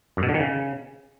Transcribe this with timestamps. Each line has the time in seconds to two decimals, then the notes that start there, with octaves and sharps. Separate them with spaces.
0.17 F#2
0.23 B2
0.29 D3
0.34 D#3
0.40 C#3